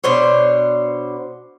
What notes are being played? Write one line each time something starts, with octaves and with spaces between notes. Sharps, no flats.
B2 D4 C5 C#5